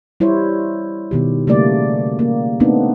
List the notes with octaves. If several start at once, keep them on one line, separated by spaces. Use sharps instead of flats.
G3 E4 C5 C#5
B2 D#3 G4
C#3 G3 A3 A#3 D5
A#3
A3 B3 C4 D4 D#4